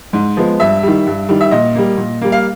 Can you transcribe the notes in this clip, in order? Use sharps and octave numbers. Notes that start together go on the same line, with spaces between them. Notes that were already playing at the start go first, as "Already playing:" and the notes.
G#2
F3 G#3 B3
G2 E5
D#3 G3
G2
D#3 G3
E5
A#2 D#5
G3 A#3
A#2
G3 A#3
F5